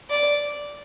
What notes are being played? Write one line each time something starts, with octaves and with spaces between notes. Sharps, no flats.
D5